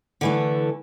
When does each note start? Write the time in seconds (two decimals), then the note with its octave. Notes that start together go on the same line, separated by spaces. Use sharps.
0.21 D3 E3 A3